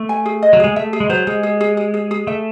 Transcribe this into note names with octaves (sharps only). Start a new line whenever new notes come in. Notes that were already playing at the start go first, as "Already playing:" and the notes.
Already playing: A3
G#5
G#4
D#5
F#3
G#3 G#4
A3 E5
G#4
G#3
F#3 C5
G#3 G#4
G#4
G#4
G#4
G#4
G#4
A3 E5